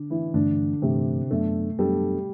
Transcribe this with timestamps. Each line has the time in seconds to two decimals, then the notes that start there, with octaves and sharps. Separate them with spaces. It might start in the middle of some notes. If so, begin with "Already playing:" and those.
Already playing: D3 D4
0.10 E3 E4
0.34 G2 D3 E3 A3 D4
0.82 G2 C3 E3 A3 C4
1.31 F#2 F#3 A3 B3 D4 A4
1.78 F#2 F#3 G3 B3 D4 A4